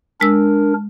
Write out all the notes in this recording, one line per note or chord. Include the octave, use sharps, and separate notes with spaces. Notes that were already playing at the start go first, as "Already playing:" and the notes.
G#3 D4 A#4 E6